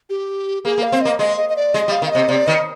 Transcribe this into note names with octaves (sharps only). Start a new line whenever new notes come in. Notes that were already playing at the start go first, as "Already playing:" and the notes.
G4
A#3 G#4
A#3
F5
C4
A#3 D#5
G#3 D#5
D#5
D#5
D5
G#3 D#5
G3
F5
D#3
F5
C3 D#5
C3 D5
D#3 D#5